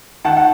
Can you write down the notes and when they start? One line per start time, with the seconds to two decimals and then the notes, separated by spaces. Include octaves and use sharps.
0.25 D#3 F#5 A5
0.37 F#5